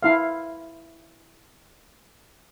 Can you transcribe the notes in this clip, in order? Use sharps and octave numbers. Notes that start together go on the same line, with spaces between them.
E4 F5